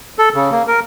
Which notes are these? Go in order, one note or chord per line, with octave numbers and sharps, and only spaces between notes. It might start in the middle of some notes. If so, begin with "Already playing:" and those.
A4
C#3
A#3
A#4